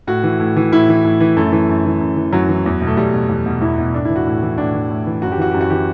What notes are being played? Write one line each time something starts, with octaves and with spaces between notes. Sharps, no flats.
A2 F#4
E3
A2
E3
A2 E4
E3
A2
E3
F#2 A3
E3
F#2
E3
F#2
E3
F#2 F#3
E3
E2
B2
A3
E2 G3
B2
E2
B2
E2 E4
B2
A2 D4
E3 E4
F#4
A2
E3
A2 D4
E3
A2
E3
F#2 F#4
G4
E3 F#4
F#2 G4
F#4
E3 G4